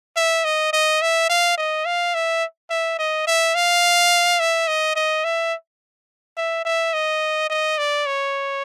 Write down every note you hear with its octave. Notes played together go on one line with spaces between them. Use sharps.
E5
D#5
D#5
E5
F5
D#5
F5
E5
E5
D#5
E5
F5
E5
D#5
D#5
E5
E5
E5
D#5
D#5
D5
C#5